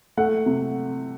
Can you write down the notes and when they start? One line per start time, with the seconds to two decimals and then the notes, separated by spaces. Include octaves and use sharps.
0.17 A3 F#5
0.46 C3